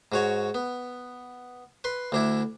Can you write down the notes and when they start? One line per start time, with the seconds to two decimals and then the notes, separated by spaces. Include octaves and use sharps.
0.12 G#2 F#4 C#5
0.54 B3
1.84 B4 C6
2.12 D2 D4 E4